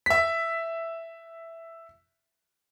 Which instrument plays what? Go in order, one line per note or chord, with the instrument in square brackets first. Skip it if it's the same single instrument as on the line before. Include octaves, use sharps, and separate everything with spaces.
[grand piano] E5 B6